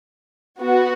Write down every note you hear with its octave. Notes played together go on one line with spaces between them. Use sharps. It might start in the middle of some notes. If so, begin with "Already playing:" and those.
B3 F#4